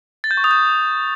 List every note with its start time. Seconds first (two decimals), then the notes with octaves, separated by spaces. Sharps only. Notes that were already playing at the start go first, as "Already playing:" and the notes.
0.24 A6
0.31 G6
0.37 C#6
0.44 D#6
0.51 G6